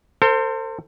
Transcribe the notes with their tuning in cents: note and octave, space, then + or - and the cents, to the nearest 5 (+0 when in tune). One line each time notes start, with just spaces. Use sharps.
A4 +45 C5 +0